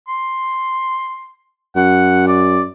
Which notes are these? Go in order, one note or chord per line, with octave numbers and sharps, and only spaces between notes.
C6
F#2 F#5
D5